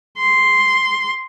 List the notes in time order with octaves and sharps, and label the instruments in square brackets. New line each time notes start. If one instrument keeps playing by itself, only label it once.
[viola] C6